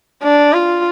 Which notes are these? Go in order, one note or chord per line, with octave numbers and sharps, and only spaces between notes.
D4
F4